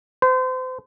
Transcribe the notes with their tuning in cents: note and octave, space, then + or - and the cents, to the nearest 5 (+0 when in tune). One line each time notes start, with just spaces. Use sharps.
C5 -35